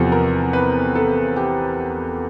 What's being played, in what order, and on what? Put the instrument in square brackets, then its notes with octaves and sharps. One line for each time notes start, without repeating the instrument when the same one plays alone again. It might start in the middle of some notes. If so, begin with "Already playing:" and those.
Already playing: [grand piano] E2 C3 F3 A4
A#4
B4
A4
G4